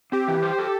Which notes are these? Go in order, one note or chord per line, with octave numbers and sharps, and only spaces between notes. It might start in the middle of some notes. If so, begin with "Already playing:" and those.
C4 G4
E3
C5
A4